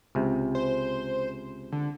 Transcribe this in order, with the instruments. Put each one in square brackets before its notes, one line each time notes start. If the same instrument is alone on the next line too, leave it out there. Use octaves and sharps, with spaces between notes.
[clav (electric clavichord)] C#2 C3
[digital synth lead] C5
D3